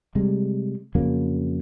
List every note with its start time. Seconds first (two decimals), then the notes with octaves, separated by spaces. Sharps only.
0.15 C3 G3 G#3
0.95 F2 C#3 F#3 A#3